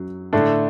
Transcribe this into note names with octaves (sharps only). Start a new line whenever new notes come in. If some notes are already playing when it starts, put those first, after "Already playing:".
Already playing: F#2 F#3
A2 D3 A3 D4